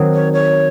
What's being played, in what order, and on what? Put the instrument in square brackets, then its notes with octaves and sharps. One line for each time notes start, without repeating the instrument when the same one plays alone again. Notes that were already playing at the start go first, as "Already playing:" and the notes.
Already playing: [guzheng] D#3 F#3 C4
[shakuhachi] C#5
C#5